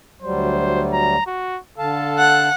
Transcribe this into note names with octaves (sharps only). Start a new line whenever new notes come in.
D2 F#3 G3 C5
A#5
F#4
D3 A4 F5 A5
F#5